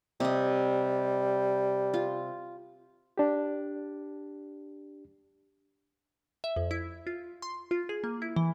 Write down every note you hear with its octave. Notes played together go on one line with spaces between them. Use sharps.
C3 G3 D#5
F4
D4 G4
E5
F2
E4
F4
C6
F4
G#4
A#3
E4
E3